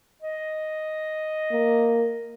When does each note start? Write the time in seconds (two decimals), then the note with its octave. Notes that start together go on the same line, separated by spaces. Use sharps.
0.22 D#5
1.52 A#3